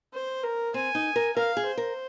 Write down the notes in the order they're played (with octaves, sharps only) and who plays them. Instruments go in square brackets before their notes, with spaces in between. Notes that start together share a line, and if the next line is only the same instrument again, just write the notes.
[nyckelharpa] C5
A#4
[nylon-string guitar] C4 [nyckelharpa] G#5
[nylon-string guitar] D#4
A#4
[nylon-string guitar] A#4 [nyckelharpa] F5
[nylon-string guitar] G#4
[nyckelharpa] C5
[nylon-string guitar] A#4